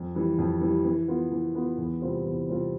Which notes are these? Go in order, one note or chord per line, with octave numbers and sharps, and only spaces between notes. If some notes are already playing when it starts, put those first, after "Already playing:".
Already playing: F2
E3 G3
F2
E3 G3
E3
B3 F4
E3
B3 F4
E2
C3 G3 C4 F4
E2
C3 G3 C4 F4